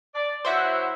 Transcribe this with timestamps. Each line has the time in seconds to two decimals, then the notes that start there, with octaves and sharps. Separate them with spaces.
0.15 D5
0.45 F#3 E4 F#4 C5 E5 F#5